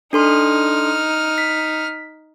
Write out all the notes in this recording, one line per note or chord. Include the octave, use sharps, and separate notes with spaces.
D4 D#4 A4 C6 F6
B6